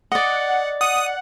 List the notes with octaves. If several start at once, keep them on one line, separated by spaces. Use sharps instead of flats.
D5 D#5 F#5
F#5 D#6